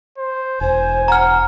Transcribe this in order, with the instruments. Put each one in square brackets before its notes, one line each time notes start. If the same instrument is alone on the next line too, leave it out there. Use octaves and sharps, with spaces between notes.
[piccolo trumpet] C5
[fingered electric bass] E1 [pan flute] C5 [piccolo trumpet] G#5
[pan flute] F#5 [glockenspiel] A#5 F6